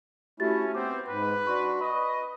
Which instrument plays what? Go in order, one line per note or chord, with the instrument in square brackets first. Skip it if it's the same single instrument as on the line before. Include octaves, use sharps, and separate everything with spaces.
[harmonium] A3 E4 [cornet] C#4 [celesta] F#4 G4 A6
[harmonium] B3 C5 [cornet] C4 [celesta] D6
[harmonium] G#2 [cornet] B4
[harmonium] D4 F#4 [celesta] C6 C#6
[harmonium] B4 [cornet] D#5 [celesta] B5 C#6